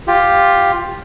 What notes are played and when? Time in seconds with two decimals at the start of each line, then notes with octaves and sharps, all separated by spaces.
0.07 F4 G4